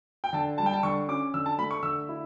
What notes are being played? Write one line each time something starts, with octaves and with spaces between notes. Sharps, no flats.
G5
D3 A5
G3 A5
G5
A5
D3 C#6
C#4 D6
D3 E6
A5
A3 B5
C#6
D3 E6
E4